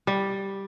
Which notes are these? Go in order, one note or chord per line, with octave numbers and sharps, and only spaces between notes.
G3